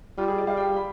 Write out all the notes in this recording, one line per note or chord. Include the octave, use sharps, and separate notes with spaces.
G3 F4
G#4
D5
G3 F5
G5
B5